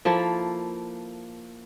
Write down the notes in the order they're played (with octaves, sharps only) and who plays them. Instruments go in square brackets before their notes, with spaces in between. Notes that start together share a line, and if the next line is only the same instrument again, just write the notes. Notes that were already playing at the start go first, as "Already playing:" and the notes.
[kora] F3 A#3 E4 A4